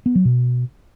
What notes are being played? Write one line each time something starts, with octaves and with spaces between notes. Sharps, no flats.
B3
F#3
B2